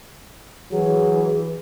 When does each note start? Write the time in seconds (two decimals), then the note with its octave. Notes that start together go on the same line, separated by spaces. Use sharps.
0.71 E3 F#3 G#4